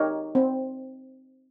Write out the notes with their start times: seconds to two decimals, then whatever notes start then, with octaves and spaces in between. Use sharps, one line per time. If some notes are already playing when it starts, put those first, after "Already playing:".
Already playing: D#4 G4 A#4 C#5
0.35 C4